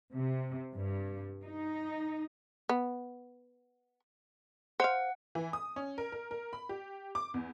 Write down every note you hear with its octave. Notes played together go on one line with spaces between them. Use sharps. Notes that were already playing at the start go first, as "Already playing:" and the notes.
C3
G2
D#4
B3
C5 F5 F#5
E3
D#6
C#4
A#4
A#4
A#4
B5
G4
D6
E2